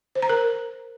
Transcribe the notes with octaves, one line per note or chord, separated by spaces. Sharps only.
C5
A#5
A#4